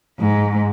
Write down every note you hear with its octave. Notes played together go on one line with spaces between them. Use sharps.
G#2